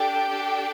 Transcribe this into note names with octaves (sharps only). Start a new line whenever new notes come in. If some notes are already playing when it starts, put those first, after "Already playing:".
Already playing: D4 G4 A4 G5
D4 A4